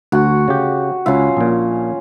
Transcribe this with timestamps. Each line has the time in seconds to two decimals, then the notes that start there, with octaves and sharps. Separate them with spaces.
0.12 D2 F#4 F#5
0.48 C#3 G4
1.06 C#2 C#4 F4 E5
1.37 A#1 A#2